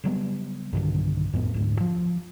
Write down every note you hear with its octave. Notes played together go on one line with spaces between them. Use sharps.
C#3 F#3 G3 B3
B1 G2 D3 D#3
F2 A2 B3
D2 G#2
F3